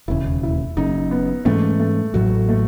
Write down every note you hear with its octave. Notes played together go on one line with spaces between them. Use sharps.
E1 D#2 C#3 E4
E4
F#1 F#2 C#3 D#4
B3
G#2 E3 G#3 A3 C#4
A3
A1 A2 F#3 F#4
A3